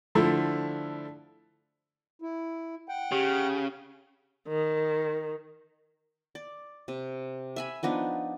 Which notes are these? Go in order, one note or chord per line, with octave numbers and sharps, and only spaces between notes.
D3 F3 A3 E4
E4
F#5 G5
C#3 G4
D#3
D5
C3
E5 G#5 B5
F3 B3 D4 D#4